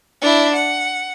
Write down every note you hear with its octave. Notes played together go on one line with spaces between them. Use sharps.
D4 E4
F#5